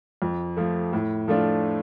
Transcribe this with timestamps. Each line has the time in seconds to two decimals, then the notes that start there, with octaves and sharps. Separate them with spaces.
0.22 F2
0.57 F3 A3
0.93 A2
1.28 F3 A3 D4 F4